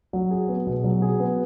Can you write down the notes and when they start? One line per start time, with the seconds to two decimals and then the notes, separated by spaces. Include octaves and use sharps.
0.13 F#3
0.31 G#4
0.49 B3
0.67 B2
0.84 F#3
1.02 G#4
1.20 B3